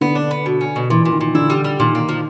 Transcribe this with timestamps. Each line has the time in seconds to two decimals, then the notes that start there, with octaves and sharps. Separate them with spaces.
0.01 D3 B3
0.15 D4
0.31 B3
0.46 B2
0.61 C#4
0.76 B2
0.90 A#2 E3
1.05 A#2
1.13 D#3
1.21 A#2
1.35 D3 E4
1.50 G3
1.64 G3
1.80 A#2 D#3
1.95 A#3
2.09 F3